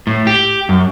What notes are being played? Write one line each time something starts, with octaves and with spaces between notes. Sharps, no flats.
A2
G4
F#2